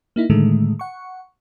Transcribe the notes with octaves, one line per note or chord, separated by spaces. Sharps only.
A#3 D#4 E4
A2 D3 D#3 G#3 A3
F#5 C#6